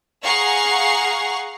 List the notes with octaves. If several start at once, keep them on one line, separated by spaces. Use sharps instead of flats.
G#4 F5 F#5 A#5 C#6 C7